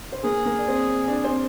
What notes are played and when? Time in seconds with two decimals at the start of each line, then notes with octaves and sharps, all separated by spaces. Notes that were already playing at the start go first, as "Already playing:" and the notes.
0.12 C5
0.24 A#3 G#4 A#4
0.45 A#3 A#4
0.59 D5
0.68 C4 C5
1.08 D4 D5
1.24 C4 C5